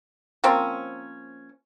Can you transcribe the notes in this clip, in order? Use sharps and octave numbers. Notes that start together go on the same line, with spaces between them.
F3 A#3 C4 C#4